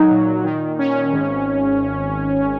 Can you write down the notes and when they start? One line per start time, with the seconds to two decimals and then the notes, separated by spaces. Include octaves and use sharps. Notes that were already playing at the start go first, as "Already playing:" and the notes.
Already playing: F#3 D#4
0.11 A#2
0.44 D#3
0.79 C#4
1.12 G#1